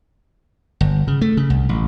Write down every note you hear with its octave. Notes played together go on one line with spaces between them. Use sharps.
G1
C#3
A3
C#3
C2
A1